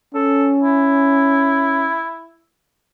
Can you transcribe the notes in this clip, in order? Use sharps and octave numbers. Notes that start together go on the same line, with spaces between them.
C#4 A4
E4